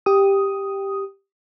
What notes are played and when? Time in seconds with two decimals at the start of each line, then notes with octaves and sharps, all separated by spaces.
0.06 G4 D#6